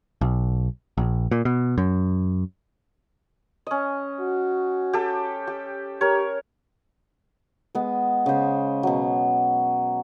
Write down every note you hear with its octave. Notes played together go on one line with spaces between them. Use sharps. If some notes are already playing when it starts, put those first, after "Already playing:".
B1
A#1
A#2
B2
F#2
C#4 D#5
F#4
G4 A4
G4
G4 A#4 C#5
G#3 B3
C#3 C5
B2 F#3